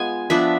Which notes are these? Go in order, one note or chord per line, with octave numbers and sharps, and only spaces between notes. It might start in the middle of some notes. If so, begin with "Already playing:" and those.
Already playing: G#3 B3 F4 G#5
F3 B3 D4 E5